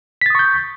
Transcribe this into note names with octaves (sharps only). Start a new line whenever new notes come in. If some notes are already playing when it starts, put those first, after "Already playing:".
C#6 D#6 G6 A6 B6